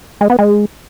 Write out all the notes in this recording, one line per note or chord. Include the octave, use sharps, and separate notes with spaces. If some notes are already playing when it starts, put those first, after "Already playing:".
G#3
B3
G#3